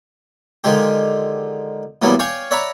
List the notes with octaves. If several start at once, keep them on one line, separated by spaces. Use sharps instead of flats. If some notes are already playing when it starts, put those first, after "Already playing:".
D3 D#3 F3 G#3 G4
A#2 E3 F#3 G3 B3
C#5 D5 F5 G5 G#5 C#6
C#5 D5 E5 F#5 A#5 B5